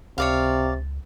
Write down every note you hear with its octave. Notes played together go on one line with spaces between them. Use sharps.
C#2 C3 C#5 D5 F5